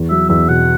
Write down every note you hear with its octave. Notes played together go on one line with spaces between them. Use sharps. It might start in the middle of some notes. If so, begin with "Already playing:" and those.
Already playing: E2
F#3 E5
E2 E5
B2 F#5